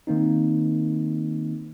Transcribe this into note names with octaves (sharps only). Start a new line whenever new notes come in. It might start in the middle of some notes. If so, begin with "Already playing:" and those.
D#3 A#3 C4 D#4